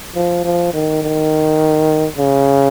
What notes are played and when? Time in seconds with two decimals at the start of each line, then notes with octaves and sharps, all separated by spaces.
0.15 F3
0.44 F3
0.73 D#3
1.03 D#3
2.18 C#3